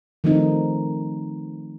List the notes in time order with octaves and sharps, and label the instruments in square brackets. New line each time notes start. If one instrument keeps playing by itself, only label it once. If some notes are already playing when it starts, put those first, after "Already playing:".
[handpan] D#3 F3 A3 C4 D#4